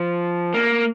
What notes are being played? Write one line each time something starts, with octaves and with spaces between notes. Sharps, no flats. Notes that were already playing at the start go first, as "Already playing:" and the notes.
Already playing: F3
A#3